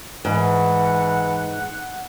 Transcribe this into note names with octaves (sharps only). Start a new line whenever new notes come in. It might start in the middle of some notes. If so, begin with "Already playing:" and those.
G#2 E3 F#5